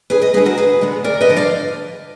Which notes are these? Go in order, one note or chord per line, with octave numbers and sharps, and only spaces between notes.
D2 G#4 B4
B4 D#5
D3 G#3 B3 G#4 B4
F#4 A#4
D2 G#4 B4
D3 G#3 B3
D2 A#4 D5
B4 D#5
D3 F3
D5 F5